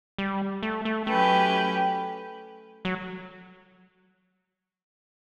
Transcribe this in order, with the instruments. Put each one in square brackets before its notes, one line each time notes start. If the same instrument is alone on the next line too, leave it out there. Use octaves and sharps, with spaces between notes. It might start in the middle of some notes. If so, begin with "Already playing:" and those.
[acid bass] G3
A3
A3
[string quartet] F#3 C#4 G4 B4 [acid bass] A3
[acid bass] F#3